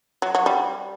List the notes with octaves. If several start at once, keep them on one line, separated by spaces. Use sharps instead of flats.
F#3
F#3
G3